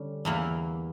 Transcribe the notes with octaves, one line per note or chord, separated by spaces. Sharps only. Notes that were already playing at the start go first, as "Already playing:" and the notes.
Already playing: D3 G3 C#4
E2 E3 A#3 E4